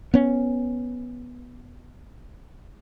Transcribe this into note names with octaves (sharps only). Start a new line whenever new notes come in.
B3 C#4